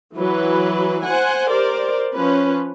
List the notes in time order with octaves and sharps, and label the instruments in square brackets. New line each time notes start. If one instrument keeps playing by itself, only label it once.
[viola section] E3 F#3 B4
C5 F#5 G#5
G4 A#4 C5 D5
F3 C#4 B4